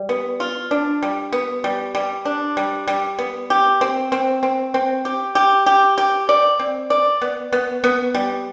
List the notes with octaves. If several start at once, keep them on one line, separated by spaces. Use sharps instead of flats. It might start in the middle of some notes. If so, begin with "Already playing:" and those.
Already playing: G3
B3
F4
D4
G3
B3
G3
G3
D4
G3
G3
B3
G4
C4
C4
C4
C4
G4
G4
G4
G4
D5
C4
D5
B3
B3
B3
G3